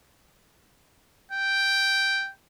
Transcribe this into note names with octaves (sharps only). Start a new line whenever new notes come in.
G5